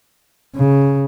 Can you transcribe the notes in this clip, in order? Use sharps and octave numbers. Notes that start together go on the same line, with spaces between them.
C#3